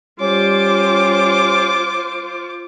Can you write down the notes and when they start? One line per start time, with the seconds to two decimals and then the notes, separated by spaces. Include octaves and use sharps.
0.21 G3 C#4 F4 C5 D6